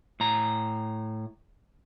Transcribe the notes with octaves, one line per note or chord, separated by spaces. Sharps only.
A2 A#5